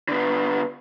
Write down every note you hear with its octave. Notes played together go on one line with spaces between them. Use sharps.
D3 B3